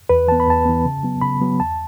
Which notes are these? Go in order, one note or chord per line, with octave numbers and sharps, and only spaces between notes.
E2 B4
E3 B3 A5
B5
E2 A5
E3 B3
C#3
F#3 B3
C#3 B5
F#3 B3
E2 A5